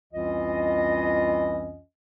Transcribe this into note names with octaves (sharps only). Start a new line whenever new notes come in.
C2 F2 E3 C#4 F4 D#5